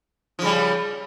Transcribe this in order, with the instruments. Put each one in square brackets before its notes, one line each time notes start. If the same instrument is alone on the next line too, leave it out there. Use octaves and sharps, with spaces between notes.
[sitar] F3
C#3
G3